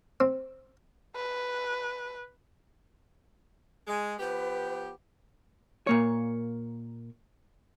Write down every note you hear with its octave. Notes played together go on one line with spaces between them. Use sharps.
C4
B4
G#3
F3 B3 G4 B4
A#2 A#3 C#5